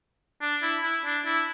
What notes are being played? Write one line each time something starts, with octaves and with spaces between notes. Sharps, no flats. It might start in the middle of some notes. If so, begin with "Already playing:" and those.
D4
E4
E4
D4
E4